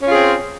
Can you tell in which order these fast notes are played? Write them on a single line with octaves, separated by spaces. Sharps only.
C#4 F4 G#4 C4